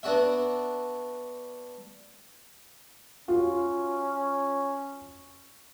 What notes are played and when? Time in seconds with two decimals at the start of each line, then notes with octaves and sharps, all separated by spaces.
0.03 B3 D4 F#4 E5
3.28 C#4 F4 F#4